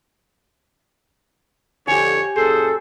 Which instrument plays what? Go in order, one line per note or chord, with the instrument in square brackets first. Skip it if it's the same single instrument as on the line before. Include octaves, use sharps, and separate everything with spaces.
[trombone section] F2 D3 [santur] G4 G#5 [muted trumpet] C#5
[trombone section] F#2 A#2 G#4 [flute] A4 [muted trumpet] C5